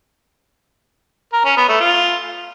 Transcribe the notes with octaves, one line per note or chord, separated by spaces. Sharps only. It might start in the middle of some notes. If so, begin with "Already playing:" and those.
A#4
C#4
B3
A3
F4